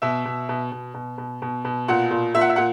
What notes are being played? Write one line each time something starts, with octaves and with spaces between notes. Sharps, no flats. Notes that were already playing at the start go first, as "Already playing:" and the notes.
B2 E5
B2
B2
B2
B2
B2
B2
B2
A#2 F#5
A#2
A#2 E5
F#5
E5
A#2 F#5